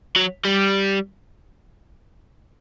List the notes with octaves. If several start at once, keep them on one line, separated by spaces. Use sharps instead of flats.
F#3
G3